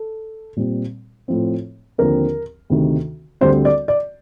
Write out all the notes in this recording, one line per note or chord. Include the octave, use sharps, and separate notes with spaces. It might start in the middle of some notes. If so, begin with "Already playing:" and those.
Already playing: A4
A#2 G3 C4
A2 F3 C4
D#2 D3 F3 C4 A#4
D2 C3 D#3
D2 D3 G3 C4 C5
D5
D5